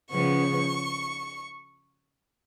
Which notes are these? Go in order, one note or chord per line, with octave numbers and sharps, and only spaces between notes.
C#3 F3 G#3 B3 C#6